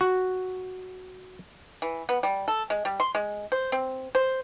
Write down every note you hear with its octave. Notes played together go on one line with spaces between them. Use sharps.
F#4
E3
B3
G3
A4
G#3
G3
C6
G#3
C5
C4
C5